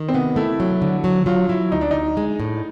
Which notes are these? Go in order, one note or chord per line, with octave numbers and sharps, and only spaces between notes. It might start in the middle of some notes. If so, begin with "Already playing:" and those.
Already playing: D#3
C4
C3 B3
A3 E4
F#3
D3
F#3
F#3 F4
F#3 E4
D2 D#4
D4
D2 D#4
G#3
A2